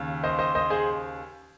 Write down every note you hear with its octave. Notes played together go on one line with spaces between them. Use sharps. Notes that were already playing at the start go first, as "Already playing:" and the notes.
Already playing: D#2 C#3
C5 D#5
C5 D#5
C5 D#5
G#4 C5